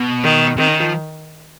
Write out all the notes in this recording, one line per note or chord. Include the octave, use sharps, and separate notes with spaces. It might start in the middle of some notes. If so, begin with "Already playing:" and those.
Already playing: B2
D#3
C3 D#3
C#3
F3